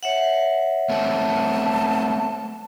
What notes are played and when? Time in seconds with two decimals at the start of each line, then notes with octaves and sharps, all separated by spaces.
0.03 C#5 E5 F#5
0.90 A3 B3 C4 A5